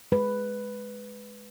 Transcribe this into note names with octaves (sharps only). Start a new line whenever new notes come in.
G#3 B4